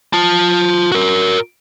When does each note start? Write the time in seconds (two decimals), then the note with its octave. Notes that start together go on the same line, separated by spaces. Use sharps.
0.13 F4 A5
0.92 F#4 A#4